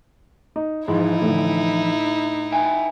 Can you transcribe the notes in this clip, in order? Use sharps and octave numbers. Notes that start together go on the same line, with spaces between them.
D#4
G#2 E3 F3 D#4 E4
A2 D3
E5 G5 G#5